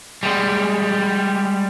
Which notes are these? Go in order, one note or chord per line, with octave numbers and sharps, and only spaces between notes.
G3 G#3